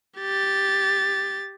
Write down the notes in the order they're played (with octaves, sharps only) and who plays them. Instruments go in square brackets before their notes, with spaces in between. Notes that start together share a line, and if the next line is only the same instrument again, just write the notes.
[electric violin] G4 A6